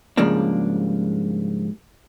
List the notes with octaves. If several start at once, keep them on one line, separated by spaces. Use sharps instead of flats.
G#2 C#3 F3 G3 A#3 D4